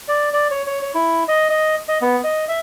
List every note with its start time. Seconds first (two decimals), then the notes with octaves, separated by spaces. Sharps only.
0.08 D5
0.33 D5
0.51 C#5
0.66 C#5
0.82 C#5
0.95 E4
1.28 D#5
1.50 D#5
1.88 D#5
2.01 B3
2.24 D#5
2.48 E5